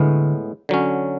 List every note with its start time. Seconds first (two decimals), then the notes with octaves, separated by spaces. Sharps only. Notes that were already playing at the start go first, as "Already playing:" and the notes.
Already playing: A2 D3 G#3 B3
0.69 D3 F#3 C#4